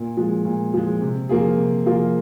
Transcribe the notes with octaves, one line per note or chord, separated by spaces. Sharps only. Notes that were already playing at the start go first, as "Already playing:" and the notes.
Already playing: A#2
F3 G#3
A#2
F3 G#3
C3
F3 A#3 F4 G#4
C3
F3 A#3 F4 G#4